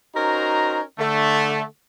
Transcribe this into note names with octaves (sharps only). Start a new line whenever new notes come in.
C#4 D#4 F#4 A#4 C5 A#5
D3 A3